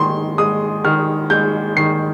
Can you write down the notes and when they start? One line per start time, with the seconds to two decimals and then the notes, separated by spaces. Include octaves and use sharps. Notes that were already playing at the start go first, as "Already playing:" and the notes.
Already playing: D#3 G#3 C6
0.38 G#3 D#6
0.84 D#3 F6
1.30 G#3 G6
1.76 D#3 C7